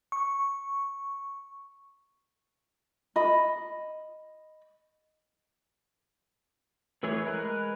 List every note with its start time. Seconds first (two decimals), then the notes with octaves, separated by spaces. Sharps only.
0.12 C#6
3.16 D#5 B5
7.03 E3 A3 E4 G#4 C#5
7.25 G#3 A#4 B4 F#6